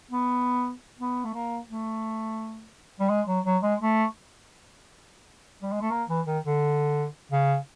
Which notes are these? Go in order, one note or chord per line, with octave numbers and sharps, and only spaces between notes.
B3
B3
A3
A#3
A3
G3
G#3
F#3
F#3
G#3
A3
G3
G#3
A3
A#3
E3
D#3
D3
C#3